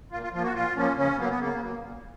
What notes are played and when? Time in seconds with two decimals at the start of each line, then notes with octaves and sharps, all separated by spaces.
0.11 A#2 F4
0.22 F4
0.33 F3 F4
0.38 A#3
0.43 F#4
0.54 A#2 F4
0.76 F3 A#3 C#4
0.97 C#3 C#4
1.18 F#3 A#3 B3
1.29 B3
1.39 C#3 A#3
1.61 F#3 A#3
1.82 A#2